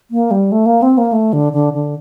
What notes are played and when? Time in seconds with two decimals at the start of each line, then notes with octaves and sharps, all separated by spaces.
0.11 A#3
0.31 G3
0.52 A3
0.66 A#3
0.82 C4
0.98 A#3
1.13 A3
1.33 D3
1.53 D3
1.73 D3